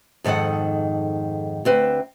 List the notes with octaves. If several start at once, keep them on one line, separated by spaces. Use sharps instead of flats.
F2 G#2 D#3 A4 F#5
D2 C4 B4